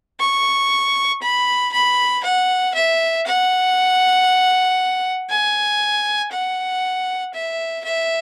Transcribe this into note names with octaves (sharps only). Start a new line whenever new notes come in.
C#6
B5
B5
F#5
E5
F#5
G#5
F#5
E5
E5